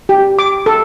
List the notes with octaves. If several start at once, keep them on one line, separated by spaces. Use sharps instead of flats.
G4
D6
A4